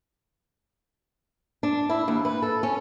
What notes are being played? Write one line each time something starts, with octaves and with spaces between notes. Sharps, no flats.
D4
E4
D#2
B4
A4
C#4